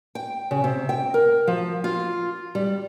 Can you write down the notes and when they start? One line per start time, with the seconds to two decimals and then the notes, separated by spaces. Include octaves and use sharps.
0.15 G5
0.51 C#3
0.64 C3
0.89 G5
1.14 A#4
1.47 F3
1.84 F4
2.55 G3